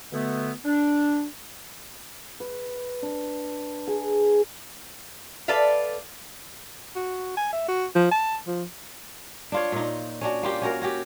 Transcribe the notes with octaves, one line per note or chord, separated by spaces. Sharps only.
B2 D3 A3 B3
D4
B4
D4
G#4
A4 B4 D5 E5 F5
F#4
G#5
E5
F#4
F3
A5
F3
D4 F4 C#5
A#2 D#4
C#4 D4 F#4
A#3 F4 G4
C#4 F#4 A#4
C#4 F#4 G4